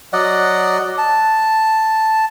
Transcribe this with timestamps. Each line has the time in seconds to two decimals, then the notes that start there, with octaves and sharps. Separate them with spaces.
0.13 F#3 D5 D#5 F#5
0.98 A5